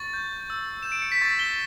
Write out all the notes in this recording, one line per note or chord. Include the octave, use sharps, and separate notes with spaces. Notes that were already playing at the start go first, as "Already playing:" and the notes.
Already playing: C#6 A6
G6
E6
G6 E7
D7
C#7
B6
C#6 A6
G7